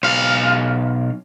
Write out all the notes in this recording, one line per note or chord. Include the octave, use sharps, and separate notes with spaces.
B1 F5